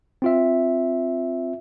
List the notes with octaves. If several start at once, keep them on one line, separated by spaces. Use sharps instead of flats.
C4 F4 E5